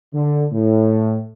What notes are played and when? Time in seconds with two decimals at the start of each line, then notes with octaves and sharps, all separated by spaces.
0.14 D3
0.53 A2